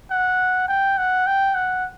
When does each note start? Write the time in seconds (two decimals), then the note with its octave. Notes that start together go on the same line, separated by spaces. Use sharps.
0.11 F#5
0.68 G5
0.97 F#5
1.27 G5
1.55 F#5